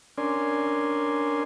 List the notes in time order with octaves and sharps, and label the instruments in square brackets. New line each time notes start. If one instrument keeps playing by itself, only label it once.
[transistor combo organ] C#4 D4 A#4 D5 G#5 C6